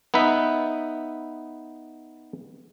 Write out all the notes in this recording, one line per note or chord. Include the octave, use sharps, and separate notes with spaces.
B3 D#4 B4 E5